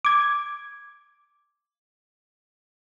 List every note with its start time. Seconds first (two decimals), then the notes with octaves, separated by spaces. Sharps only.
0.05 D6 G#6